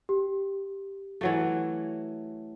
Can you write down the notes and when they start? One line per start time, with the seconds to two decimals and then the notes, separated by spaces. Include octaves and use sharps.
0.09 G4
1.21 E3 F#3 A3